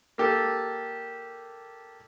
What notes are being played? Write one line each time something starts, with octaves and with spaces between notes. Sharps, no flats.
A#3 G4 A4